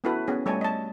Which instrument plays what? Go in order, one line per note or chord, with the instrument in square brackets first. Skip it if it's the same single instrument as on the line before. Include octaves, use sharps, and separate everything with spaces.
[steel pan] B3 C#4 E4 F#4 A4 B4
B3 C#4 G#4
G3 A3 C#5 D#5 G#5 A5
D#5 A5